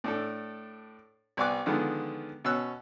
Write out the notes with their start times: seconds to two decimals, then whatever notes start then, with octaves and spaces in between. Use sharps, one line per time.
0.04 A2 D4 A4
1.37 C2 B3 D5 G#5 D6 F#6
1.66 D3 D#3 F3 G#3 B3
2.45 B2 C#4 E6 F#6